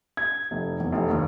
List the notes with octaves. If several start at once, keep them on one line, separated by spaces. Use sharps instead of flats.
G#6
F1
E2
F1
D#2